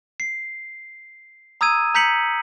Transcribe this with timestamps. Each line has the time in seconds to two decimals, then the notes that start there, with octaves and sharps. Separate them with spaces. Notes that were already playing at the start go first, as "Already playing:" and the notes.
0.20 C7
1.61 A#5 D#6 E6 G#6 D#7
1.95 A#5 G6 B6 C#7 F#7